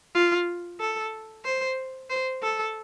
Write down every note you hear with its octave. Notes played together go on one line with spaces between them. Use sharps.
F4
A4
C5
C5
A4